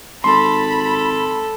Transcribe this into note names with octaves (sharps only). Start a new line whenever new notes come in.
G#1 A4 B5 C6